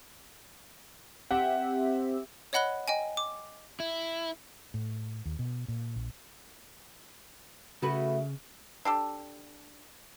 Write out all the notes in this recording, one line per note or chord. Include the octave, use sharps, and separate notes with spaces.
C4 G4 E5 F#5
C#5 D#5 F#5 B5 F#6 G7
D#5 G5 G#5
D6
E4
A2
D#2
B2
A#2
A#1
C#3 A3 F#4 B4
D4 G4 A4